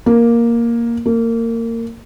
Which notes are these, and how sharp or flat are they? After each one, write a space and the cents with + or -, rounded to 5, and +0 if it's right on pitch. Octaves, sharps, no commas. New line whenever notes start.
A#3 +5
A#3 -25